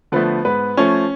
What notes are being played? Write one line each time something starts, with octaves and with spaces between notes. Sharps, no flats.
D3 F3 A3 B3 B4
G#2 B3 B4
F3 A3 C#4 C#5